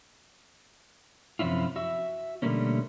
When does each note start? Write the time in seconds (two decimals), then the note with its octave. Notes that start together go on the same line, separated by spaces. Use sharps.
1.39 F#2 C3 F3 C#4 E4 F4
1.76 F#4 E5
2.42 B2 D3 G3 A3 A#3 C#4